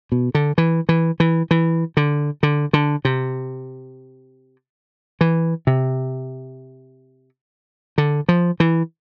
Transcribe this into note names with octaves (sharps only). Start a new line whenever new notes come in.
B2
D3
E3
E3
E3
E3
D3
D3
D3
C3
E3
C3
D3
F3
E3